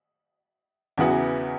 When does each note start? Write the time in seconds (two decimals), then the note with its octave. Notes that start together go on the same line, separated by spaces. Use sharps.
0.98 E2 C#3 E3 B3 F#4